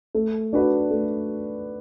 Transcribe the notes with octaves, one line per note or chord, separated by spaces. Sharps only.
A3
D4 F#4 B4 D5
A3